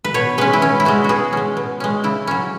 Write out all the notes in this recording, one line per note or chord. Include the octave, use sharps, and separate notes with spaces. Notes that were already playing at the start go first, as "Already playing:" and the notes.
B4
B2 C#5
G#3 C#4 B4
E4
B2 C#4
E4
G#3 C#4 F#4
B2 F#4 G#4
G#3 C#4
B2
G#3 C#4
C#3 E4
F#3 C#4